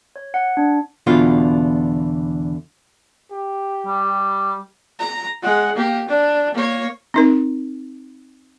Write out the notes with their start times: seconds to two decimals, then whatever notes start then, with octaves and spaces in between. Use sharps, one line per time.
0.16 C#5
0.34 F#5
0.57 D4
1.07 E2 B2 D3 F4
3.31 G4
3.87 G3
5.00 A#5
5.43 G#3 F#5
5.76 A#3 G4
6.09 D4
6.55 A#3 C#5
7.14 C4 D#4 A#4